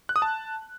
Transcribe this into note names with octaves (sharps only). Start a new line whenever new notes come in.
F#6
D#6
A5